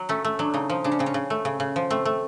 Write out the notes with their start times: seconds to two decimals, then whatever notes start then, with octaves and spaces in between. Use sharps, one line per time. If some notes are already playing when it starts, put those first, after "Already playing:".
Already playing: F#3
0.09 A3 C#4
0.25 A3
0.39 F#3 D4
0.54 C#3 D#4
0.70 F3 D#4
0.84 C#3 D4
0.92 C#4
0.99 C#3 C4
1.06 C#4
1.14 C#3
1.30 A3
1.45 C#3
1.60 C#3
1.76 F3
1.90 A3 C4
2.05 A3